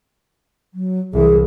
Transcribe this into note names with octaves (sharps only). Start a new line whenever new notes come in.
F#3
C2 E3 G#4